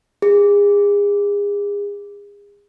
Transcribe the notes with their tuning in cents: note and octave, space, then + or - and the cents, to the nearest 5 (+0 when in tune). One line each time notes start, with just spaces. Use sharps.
G#4 -35